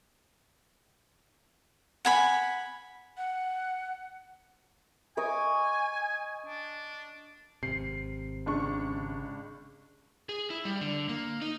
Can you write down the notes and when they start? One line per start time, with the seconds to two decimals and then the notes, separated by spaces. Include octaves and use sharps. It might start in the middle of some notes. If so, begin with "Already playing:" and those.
2.05 F#5 G#5 B5
3.17 F#5
5.17 D#5 G#5 C#6 D6
6.46 D4
7.63 G#1 C3 C7
8.46 C#2 D4 C#6
10.29 G#4
10.50 E4
10.65 G3
10.81 D3
11.09 A#3
11.42 D#4